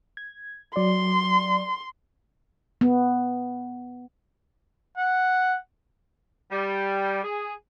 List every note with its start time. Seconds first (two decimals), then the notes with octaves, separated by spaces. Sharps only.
0.17 G#6
0.76 F#3 D5 C6
2.81 B3
4.98 F#5
6.52 G3
7.24 G#4